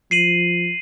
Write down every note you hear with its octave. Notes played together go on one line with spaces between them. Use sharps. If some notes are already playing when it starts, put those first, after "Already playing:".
F3 C7 D#7 F#7